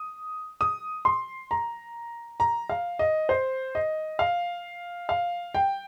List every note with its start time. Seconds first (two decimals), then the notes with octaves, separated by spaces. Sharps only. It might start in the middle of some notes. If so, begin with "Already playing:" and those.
Already playing: D#6
0.61 D#6
1.05 C6
1.51 A#5
2.40 A#5
2.69 F5
2.99 D#5
3.29 C5
3.75 D#5
4.19 F5
5.09 F5
5.55 G5